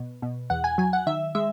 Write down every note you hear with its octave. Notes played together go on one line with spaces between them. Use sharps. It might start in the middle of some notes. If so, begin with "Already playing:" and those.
Already playing: B2
B2
E2 F#5
G#5
F#3 G#5
F#5
D#3 E5
G#3 E5